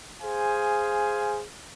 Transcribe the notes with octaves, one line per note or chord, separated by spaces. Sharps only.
G#4 C5 F5 G#5